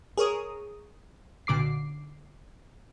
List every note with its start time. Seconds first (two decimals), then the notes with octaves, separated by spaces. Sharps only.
0.17 G#4 A#4 C#5 D#6
1.47 B1 A#2 D3 D6 C7